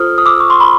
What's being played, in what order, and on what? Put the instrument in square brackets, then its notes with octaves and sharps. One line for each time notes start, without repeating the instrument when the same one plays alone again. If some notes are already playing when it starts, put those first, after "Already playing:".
Already playing: [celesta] F4 A4 C5 D#6 F6
D#6
D6 E6
C#6
C6
B5